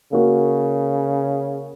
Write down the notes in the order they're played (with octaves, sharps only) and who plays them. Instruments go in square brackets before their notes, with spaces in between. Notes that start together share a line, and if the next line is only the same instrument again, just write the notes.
[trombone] C#3 [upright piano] A#3 F#4